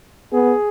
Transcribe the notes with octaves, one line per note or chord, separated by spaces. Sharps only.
B3 G#4